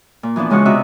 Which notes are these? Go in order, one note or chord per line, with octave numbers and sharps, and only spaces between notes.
A#2
E3 F3 B3 D4
C#3 G#3 F4 F#4 C#6 F#6
C3 B3 D4 F#4 D#5 E5